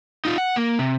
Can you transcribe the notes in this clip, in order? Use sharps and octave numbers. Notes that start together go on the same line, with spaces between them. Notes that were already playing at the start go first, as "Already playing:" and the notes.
D#4 F4
F#5
A#3
C3